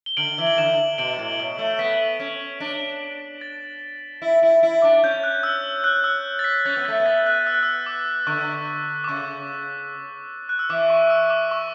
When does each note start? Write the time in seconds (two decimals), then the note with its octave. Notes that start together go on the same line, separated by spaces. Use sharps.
0.06 G7
0.17 D3 D7 F#7
0.38 E3
0.47 F#7
0.58 D3 E7 G7
0.98 B2 D7 F#7
1.19 A2
1.39 B2
1.59 A3
1.79 B3 B6
2.20 C#4
2.60 D4
3.41 A6
4.22 E4
4.43 E4
4.63 E4
4.83 D4
5.03 C#4 G6
5.24 F#6
5.43 E6
5.84 F#6
6.04 E6
6.39 A6
6.44 B6
6.65 C#4 A6
6.77 B3
6.85 A3 A6
7.00 B3
7.06 A6
7.26 F#6
7.47 E6
7.55 F#6
7.63 E6
7.86 D6
8.27 D3 C#6
9.04 D6
9.08 C#3 C#6
10.49 F#6
10.59 E6
10.69 E3 D6
10.90 C#6
11.10 E6
11.30 D6
11.51 C#6